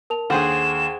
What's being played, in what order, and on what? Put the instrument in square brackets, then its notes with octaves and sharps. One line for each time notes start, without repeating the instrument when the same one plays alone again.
[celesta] A#4 A5 F7
[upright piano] D#2 [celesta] D4 A4 [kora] G#4 C5 F#5 [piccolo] E7